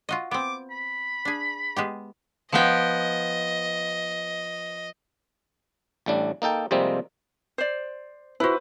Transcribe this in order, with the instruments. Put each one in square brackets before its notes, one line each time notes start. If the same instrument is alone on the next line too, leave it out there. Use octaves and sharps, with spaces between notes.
[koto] F4 F#4 D#5
[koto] B3 C4 [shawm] D6
[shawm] B5
[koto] D4 G#4
G#3 B3 G4
[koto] F3 B3 G5 [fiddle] D#5
[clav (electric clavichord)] A1 A2 G3 D4
A#3 D#4 A4 G5
F2 C3 G3 G#3 A#3 C4
[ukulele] C5 D5
[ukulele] E4 F#4 [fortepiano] B4 C5